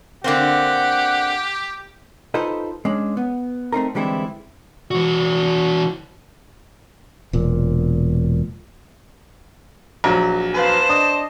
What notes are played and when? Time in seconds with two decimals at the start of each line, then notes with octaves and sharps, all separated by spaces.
0.24 D3 A#3 C4 G4 F#5
2.34 D#4 F4 A4 B4 C5 D#5
2.85 G#3 C#4 D4
3.17 B3
3.73 A3 C4 D#4 A#4
3.95 D3 E3 G3 G#3 C4 E4
4.91 E3 F#4
7.33 E1 A#2
10.04 A#1 F#3
10.54 B4 C5 F5 A5
10.89 D4 D#5 D#6